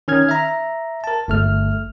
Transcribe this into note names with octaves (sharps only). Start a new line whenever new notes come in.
D#3 C#4 F6 G#6
E5 A#5
A#4 A5
G1 A3 F6